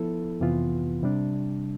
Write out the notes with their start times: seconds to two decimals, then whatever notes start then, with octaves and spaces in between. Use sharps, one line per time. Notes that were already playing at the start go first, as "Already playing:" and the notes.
Already playing: F3 B3 E4 A4
0.40 F2 C3 E3 B3 F4
1.03 C3 G3 D4